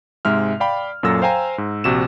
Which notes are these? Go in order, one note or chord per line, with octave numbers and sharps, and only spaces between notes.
G#2 C3 G#3 E5 F6
D5 F5 G5 B5
F#2 A#2 F#3 A4 E6 A#6
C5 F5 G5 G#5 A#5
G#2
A#1 C3 F#4 E7